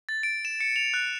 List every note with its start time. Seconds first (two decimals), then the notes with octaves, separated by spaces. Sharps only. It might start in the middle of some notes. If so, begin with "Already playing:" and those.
0.09 A6
0.23 D7
0.45 E7
0.61 C#7
0.76 F7
0.94 F#6